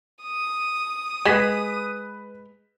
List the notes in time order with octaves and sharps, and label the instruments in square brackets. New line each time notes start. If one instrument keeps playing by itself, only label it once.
[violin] D#6
[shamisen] G#3 [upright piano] B4 B6 E7